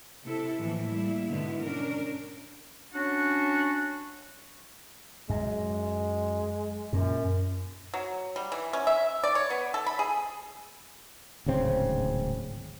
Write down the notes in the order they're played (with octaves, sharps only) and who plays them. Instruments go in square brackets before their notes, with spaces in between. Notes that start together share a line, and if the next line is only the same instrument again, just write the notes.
[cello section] C3 E4 A4
A2 E3 F3 A#3
G3 A#3 E4
G#2 B2 D3 D#3 B3 E4
C#4 D4 A#4
[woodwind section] C#4 D4 F#4
[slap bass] F#2 [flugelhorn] G#3
[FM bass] F#2 [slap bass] A#2
[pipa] F#3
G3
E3
C#4
E5
D5
C#5
B3
A4
B5
G#4
[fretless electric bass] D1 G#1 C#3 C4